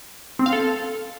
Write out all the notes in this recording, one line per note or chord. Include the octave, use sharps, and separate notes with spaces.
C4
F5
A4